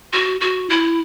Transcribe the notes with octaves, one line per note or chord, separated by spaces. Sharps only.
F#4
F#4
E4